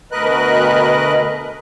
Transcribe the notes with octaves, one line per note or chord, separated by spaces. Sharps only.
D2 B2 A#4 B4 D#5 F#6